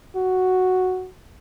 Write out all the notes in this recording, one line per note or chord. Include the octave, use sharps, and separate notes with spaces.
F#4